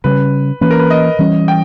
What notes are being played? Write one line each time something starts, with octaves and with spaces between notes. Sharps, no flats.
C#3 G3 C#4 B4
E3 A#3 C#4 B4
A#4
B4
D#5
E3 G3 C#4
G5